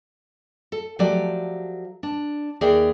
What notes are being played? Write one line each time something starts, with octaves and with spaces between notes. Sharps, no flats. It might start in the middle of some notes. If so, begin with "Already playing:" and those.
A4
F3 F#3 A3 G4 D5
D4
D#2 G#4 A#4 D5 E5 G5